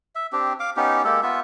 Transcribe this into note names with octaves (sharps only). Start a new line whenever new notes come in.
E5
C4 D4 G4
F5 D6
B3 C#4 D#4 G4
G#3 A#3 G4 A4
B3 F4 E5